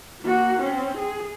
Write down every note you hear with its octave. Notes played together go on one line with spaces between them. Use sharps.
A#3 F#4
C4 C#4
G#4